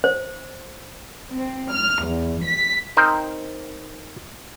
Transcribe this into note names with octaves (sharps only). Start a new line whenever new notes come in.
C5
C4
F6
E2
B6
C4 D#4 A#4 C5